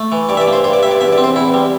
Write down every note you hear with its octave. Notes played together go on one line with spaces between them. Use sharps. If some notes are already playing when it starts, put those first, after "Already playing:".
Already playing: A3
E3
G2 D5
E5
D5
A#3
C5
G2 C5
D5
G2 E5
D5
E2 E5
D5
C4
C5
E2 E4
G3